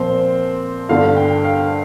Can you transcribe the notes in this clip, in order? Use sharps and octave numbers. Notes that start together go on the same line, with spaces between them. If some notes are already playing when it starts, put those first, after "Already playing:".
Already playing: A#2 F3 C4 C5
G2 D3 A3 D4 F5
G5
F5